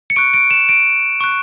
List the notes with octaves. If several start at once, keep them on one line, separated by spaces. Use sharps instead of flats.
C#7
C#6 F#6 D7
D7
E7
D7
C#6 F#6